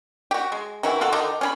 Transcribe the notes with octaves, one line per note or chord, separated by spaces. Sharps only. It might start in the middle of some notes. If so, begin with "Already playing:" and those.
F#4 G4
G#3
D#3 E3 E4 F#4
F4 F#4 A4
D3 D#3 D4 D#4
C#4 G#4 B5